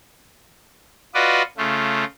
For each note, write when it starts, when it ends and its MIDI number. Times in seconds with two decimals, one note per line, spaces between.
1.14 1.42 65
1.14 1.42 66
1.14 1.42 71
1.14 1.42 74
1.14 1.42 75
1.57 2.04 49
1.57 2.04 57
1.57 2.04 65